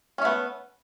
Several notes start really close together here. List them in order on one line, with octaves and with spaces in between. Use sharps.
C#4 A3 B3